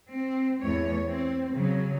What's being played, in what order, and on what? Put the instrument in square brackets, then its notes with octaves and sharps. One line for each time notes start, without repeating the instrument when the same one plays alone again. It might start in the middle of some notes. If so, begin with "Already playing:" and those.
[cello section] C4
E2 A3 C#5
C4
C#3 F#3